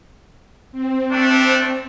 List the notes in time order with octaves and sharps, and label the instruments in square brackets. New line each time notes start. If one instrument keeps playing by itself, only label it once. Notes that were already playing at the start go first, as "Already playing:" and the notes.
[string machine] C4
[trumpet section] A3 D4